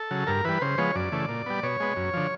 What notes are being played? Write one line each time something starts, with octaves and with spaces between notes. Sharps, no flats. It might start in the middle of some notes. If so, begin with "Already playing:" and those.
Already playing: A4
C#3 F#3
G2 A#4
E3 G3 B4
C#3 C5
F3 G#3 B3 C#5
F#2 D5
C#3 E3 A3
A#2
G3 B3
B2 C#5
G#3 B3
F#2
D3 F3